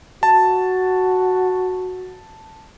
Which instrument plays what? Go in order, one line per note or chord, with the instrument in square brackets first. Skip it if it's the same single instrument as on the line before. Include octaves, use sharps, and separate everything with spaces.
[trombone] F#4 [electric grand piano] A5